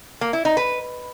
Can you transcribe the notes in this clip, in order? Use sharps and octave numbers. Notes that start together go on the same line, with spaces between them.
A#3
E4
D#4
B4